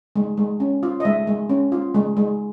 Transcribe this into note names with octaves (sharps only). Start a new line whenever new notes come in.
G#3
G#3
C#4
F4
D#5
G#3 E5
G#3
C#4
F4
G#3
G#3